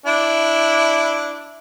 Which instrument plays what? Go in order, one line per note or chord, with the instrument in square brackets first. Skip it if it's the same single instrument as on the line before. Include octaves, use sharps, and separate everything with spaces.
[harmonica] D4 E4